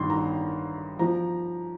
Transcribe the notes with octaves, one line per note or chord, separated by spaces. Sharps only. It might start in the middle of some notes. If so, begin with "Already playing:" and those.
Already playing: A1 G2 D#3 C6
A#5
F3 A#5